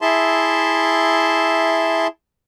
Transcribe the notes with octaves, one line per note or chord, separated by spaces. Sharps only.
E4 G#4 E5 A5 C6